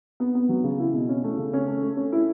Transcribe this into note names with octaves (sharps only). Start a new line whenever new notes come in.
B3
B3
F#3
C#3
E4
B2
C#4
A3
C#3
C#4
A3
A3
C#4
E4